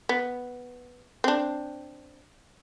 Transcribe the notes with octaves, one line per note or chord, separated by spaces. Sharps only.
B3
C4 D4